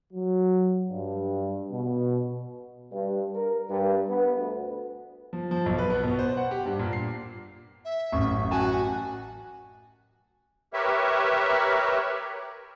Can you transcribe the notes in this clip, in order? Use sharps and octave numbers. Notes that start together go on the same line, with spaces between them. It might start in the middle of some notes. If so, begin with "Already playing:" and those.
F#3
G2
B2
G2
A#4
G2
B3
D2
F3
F3
B1
B4
B3
B2
C5
F#5
G4
G2
A#2
C7
E5
A1 F#2 C#6
F#4 G#5 A5
G4 A#4 B4 C#5 E5